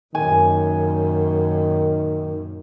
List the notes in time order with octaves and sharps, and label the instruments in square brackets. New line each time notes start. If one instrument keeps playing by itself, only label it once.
[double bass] F#2 A#2 [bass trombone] D#3 [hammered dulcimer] G#5